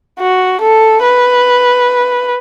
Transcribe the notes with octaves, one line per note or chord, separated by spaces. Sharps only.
F#4
A4
B4